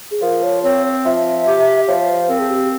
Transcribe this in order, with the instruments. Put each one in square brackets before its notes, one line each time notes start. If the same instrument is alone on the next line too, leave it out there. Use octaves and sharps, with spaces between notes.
[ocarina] G#4
[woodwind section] F3 [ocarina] A#4
[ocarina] C#5
[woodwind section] C4 [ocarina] C#5
[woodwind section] F3 [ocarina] E5
[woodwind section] G4
[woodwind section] F3 [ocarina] C#5
[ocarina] C#5
C5
[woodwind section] C4 [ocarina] A#4
[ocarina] G#4
G4